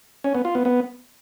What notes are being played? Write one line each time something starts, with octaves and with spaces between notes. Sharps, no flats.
C#4
B3
F4
B3
B3